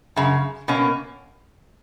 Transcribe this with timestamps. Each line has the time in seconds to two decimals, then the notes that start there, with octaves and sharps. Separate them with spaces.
0.16 F#2 C#3
0.68 B2 A#3 C#4